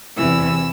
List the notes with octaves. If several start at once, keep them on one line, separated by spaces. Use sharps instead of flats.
E2 C3 E3 E6